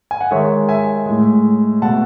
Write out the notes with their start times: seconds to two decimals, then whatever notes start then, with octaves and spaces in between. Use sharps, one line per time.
0.11 G#5
0.21 F#5
0.31 D#3 G#3 C#5 E5
0.69 E5 G#5
1.06 A2 G#3
1.82 B2 A3 F#5 A5